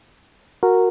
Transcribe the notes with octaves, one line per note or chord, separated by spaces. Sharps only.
F#4 A#4